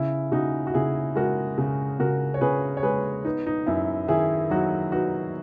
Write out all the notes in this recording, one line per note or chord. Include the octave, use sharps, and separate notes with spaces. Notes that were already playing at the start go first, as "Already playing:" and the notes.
Already playing: C#3 E4
C#3 D#4 F#4
F#4
C#3 E4 G#4
G#3 F#4 A#4
C#3
C#3 F#4 A#4
C#5
C#3 G#4 B4
C#5
G#3 G#4 B4
B3 D#4
D#4
F#2 E4
D#3 E4 G#4
F#3 D#4 F#4
B3 D#4 F#4